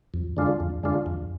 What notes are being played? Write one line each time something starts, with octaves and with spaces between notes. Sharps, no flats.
F2
D3 G#3 D4 F4
F2
D3 G#3 D4 F4
F2